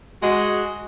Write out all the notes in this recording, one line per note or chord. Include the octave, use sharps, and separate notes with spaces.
G#3 F#4